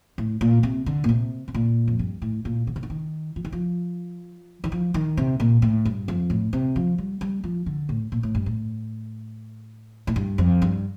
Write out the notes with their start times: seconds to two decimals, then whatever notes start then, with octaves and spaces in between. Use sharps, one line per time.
0.18 A2
0.41 A#2
0.63 C3
0.86 D3
1.04 A#2
1.09 C3
1.48 C3
1.54 A#2
1.88 F2
1.99 G2
2.22 A2
2.45 A#2
2.67 D3
2.76 C3
2.83 D3
2.90 D#3
3.36 F3
3.45 D#3
3.52 F3
4.64 D#3
4.72 F3
4.94 D#3
5.17 C3
5.40 A#2
5.62 A2
5.85 G2
6.08 F2
6.30 A2
6.53 C3
6.76 F3
6.98 G3
7.21 G3
7.44 F3
7.66 D3
7.89 A2
8.12 A#2
8.23 A2
8.35 G2
8.46 A2
10.07 A2
10.16 G2
10.38 F2
10.62 G2